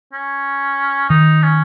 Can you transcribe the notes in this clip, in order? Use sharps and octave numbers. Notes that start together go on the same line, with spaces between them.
C#4
D#3 D#4
C#4